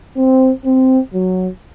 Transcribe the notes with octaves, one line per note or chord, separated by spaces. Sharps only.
C4
C4
F#3